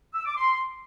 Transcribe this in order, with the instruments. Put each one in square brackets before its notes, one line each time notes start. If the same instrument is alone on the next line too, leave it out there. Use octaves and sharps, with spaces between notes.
[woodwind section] E6
D6
C6